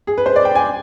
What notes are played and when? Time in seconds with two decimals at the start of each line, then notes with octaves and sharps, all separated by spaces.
0.07 G#4
0.18 B4
0.26 C5
0.36 D5
0.45 G5
0.55 G#5